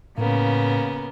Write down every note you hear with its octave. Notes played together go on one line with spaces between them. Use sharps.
A2 C#3 A#3 B3